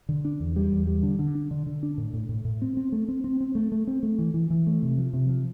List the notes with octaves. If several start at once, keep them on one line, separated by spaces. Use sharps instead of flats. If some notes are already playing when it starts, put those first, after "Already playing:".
D3
D4
E2
G3
E2
G3
D3
D3
D4
D3
D3
D4
A2
A2
A2
A2
C4
C4
A3
C4
C4
C4
A3
A3
C4
A3
E3
E3
E3
A3
C3
F3
C3
F3